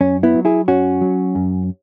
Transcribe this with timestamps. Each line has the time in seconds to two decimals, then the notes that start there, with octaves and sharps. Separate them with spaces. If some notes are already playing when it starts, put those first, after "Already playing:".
0.01 F#2 C#4
0.23 B3 E4
0.34 F#3
0.45 E4 G#4
0.68 F#2 C#4 F#4
1.01 F#3
1.35 F#2